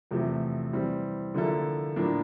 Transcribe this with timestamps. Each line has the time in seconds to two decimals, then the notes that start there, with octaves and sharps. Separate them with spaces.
0.11 E2 C3 F3 A3
0.73 E3 G3 C4
1.34 D3 F3 A#3 E4 A4
1.96 A2 F3 A#3 D4